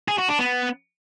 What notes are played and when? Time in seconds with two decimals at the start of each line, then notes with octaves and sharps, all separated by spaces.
0.08 G#4
0.18 F#4
0.29 D4
0.39 B3